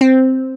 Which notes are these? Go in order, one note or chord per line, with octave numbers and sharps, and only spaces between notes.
C4